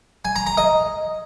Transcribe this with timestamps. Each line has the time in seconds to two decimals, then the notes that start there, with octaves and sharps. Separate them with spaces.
0.25 G#5
0.36 A#5
0.47 A#5
0.57 D#5